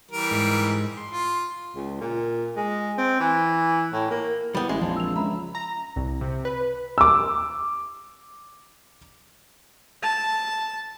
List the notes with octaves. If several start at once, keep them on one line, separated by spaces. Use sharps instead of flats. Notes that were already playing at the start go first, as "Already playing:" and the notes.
E3 G3 A#4
G#2
C6
F4
C#2
A#2
G#3
C4
E3
A2
A#3
G3 B3 E4
A1 G#3 E5
A#1 F3 C4 D4
E6 F7
C#2 E5 A#5 B5
A#5
C2
C3
B4
D6 E6
A5